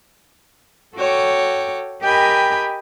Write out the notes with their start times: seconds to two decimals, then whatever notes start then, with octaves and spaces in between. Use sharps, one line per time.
0.96 F#4 A4 C#5 G5 D6
2.02 G4 A#4 D#5 G5 G#5 B5